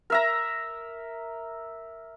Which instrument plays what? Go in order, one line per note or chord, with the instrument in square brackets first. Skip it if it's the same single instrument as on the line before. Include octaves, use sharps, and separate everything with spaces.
[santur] A#4 E5 A#5